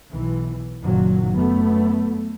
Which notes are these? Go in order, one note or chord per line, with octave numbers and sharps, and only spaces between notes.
B1 E3
F#1 A#2 D#3 F#3
F#2 A3 B3